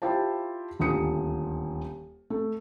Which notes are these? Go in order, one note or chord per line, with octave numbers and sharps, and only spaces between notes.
E4 F4 G4 C5 A5
D#1 D2 F4 D#6 C#7
A3